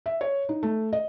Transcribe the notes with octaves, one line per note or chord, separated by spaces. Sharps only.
E5
C#5
D#4
A3
D#5